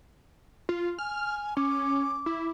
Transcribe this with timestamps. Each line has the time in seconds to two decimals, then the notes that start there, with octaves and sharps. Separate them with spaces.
0.69 F4
0.99 G#5 F6
1.57 C#4 D6
2.26 E4